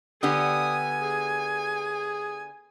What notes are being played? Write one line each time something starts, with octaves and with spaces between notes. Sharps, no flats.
D3 B3 G4 G#5 D#6
G#4